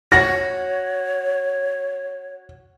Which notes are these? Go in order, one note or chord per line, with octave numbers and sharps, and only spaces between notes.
F#4 C#5 A#6